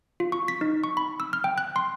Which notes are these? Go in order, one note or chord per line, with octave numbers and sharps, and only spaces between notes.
F4
C#6
B6
D#4
C#6
B5
E6
F6
G5
F#6
C6